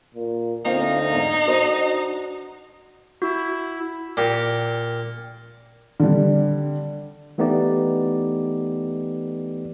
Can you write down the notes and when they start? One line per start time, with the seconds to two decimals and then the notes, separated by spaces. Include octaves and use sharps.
0.14 A#2
0.65 D2 A#3 C4 D#4 F4
1.12 E2 G#2
1.47 D4 F#4 C5 D#5
3.22 E4 F#4
4.17 A#2 G4
6.00 D3 G3
7.38 E3 A3 B3 D#4 G4 D5